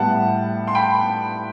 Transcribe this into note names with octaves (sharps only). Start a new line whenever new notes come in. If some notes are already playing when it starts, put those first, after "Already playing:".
Already playing: A2 G3 B3 F#5 A5
C6
G5 B5